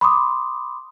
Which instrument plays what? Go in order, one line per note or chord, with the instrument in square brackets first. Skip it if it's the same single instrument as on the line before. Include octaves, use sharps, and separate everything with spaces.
[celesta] B5 C6 D6 D#6